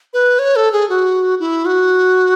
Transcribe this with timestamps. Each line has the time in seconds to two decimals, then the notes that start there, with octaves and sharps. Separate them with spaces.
0.14 B4
0.39 C#5
0.56 A4
0.72 G#4
0.89 F#4
1.40 E4
1.66 F#4